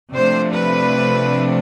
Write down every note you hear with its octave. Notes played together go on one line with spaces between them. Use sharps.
C3 F3 A3 D4 C5
B4